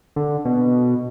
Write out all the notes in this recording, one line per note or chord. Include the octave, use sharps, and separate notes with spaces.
D3
B2